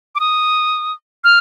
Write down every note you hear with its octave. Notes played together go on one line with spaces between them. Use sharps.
D6
D#6
F6